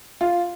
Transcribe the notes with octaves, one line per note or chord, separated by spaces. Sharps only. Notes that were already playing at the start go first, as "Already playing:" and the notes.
F4